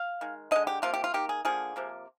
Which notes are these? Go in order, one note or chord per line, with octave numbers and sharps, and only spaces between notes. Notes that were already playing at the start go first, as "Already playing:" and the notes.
Already playing: F5
D#3 G#3
D3 G#3 D#5
G4
C3 F3 A#3 F4
G4
F4
D#3 A#3 G4
G#4
D3 F3 A#3 G#4
C3 F3 A#3